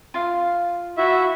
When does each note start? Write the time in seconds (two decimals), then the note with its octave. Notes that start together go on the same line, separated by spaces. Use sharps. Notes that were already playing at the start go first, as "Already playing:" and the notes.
0.14 F4 F5
0.98 E4 F#4 E5